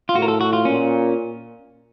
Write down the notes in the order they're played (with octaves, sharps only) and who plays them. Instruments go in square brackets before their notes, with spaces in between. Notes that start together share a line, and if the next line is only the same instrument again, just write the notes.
[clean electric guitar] F4
[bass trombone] A2 [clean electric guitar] F#4
[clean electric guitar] A#4
A4
F#4
F4
[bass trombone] A#2 [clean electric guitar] C#4